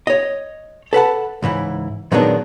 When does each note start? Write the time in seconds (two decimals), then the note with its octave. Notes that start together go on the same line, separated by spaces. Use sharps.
0.07 C#5 D#5
0.93 A4 B4 F#5 A5
1.42 C#2 G#2 E3 E4
2.12 A#2 D#3 F#3 G#3 B3 D4